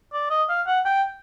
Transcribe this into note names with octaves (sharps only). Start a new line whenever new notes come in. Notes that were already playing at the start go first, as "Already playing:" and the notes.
D5
D#5
F5
F#5
G5